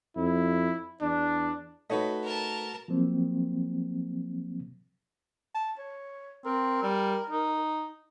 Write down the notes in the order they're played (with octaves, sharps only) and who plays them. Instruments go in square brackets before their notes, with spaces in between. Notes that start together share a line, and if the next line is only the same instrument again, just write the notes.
[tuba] F2 [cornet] E4
[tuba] E2 [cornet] D4
[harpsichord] A3 F#4 B4 [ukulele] D#4 C#5 D#5
[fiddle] A#4 A5
[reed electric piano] F3 F#3 A#3 C4
[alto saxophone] A5
C#5
[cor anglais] C4 [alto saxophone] A#4
[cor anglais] G3
D#4